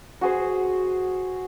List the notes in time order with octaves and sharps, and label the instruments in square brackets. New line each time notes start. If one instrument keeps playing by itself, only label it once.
[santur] F#4 G#4 C5